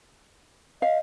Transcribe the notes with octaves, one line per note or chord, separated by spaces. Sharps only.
D#5 F5